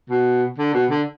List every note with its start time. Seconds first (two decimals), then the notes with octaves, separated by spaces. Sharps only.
0.10 B2
0.58 D3
0.74 B2
0.90 D3